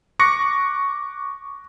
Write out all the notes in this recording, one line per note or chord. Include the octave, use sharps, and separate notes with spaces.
C#6 D6 F#6 A#6 C#7